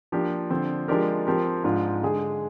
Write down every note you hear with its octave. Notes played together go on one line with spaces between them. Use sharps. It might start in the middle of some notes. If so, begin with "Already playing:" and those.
F3 A#3 D4 G4 A#4
D3 F3 C4
F3 G#3 D4 G4 A#4
F3 C4 G4 A#4
G#2 F3 G#3 D4 F4
D3 G#3 D4 G#4